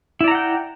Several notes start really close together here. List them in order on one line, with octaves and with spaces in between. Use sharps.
E4 D5 A#5 F#5 G5